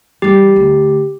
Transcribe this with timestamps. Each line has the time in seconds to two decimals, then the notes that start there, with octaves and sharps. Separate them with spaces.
0.22 E3 G3 G4
0.56 D2